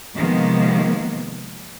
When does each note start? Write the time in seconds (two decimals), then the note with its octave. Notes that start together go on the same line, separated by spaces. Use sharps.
0.14 C3 D#3 F3 G#3 A#3 B3